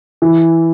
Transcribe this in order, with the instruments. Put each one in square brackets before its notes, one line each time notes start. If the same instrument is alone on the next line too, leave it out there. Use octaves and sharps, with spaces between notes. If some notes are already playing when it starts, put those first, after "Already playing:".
[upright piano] E3